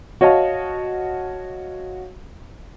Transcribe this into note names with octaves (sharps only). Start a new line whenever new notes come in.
F#4 C#5 D#5 F5 A5